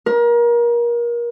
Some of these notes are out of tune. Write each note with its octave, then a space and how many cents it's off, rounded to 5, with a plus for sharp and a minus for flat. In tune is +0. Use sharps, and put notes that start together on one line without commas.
A#4 +30